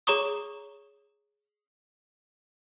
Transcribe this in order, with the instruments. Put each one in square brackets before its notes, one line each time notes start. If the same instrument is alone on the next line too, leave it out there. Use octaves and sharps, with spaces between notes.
[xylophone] G#4 C#5 A#5 C#6 D#6